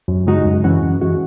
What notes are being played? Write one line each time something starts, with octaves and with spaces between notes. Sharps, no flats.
F#2
C#3 G#3 D#4 F#4
F#2
E3 G#3 C#4 F#4
F#2
E3 G#3 C#4 F#4